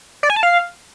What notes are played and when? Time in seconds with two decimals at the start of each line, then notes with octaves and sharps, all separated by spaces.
0.23 D5
0.30 G#5
0.36 A5
0.43 F5